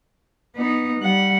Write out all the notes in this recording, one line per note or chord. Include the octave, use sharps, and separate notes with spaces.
B3 D#4
G3 F#5